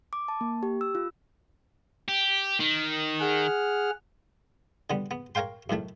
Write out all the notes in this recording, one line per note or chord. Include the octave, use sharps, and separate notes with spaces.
D6
A5
A#3
G4
E6
F4
G4
D#3
G#4 F#5 F6
D3 G3 B3
B3
A#4 C#5 F5 G5 C6
F#2 A2 D#3 A3